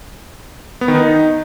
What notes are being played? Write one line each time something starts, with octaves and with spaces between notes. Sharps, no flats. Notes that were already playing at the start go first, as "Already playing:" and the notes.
B3
D#3
D#4